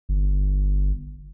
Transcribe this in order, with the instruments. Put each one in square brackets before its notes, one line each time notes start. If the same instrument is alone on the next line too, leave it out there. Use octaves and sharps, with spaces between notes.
[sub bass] G1